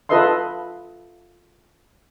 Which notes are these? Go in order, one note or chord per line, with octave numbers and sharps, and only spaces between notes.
F4 A4 B4 D#5 E5 C6